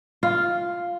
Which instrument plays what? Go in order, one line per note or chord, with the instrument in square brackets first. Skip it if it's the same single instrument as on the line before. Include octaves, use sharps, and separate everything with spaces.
[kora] F4